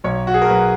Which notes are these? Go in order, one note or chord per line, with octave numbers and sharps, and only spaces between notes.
B1 C#5
F#4
G#4
A#4
B1 B4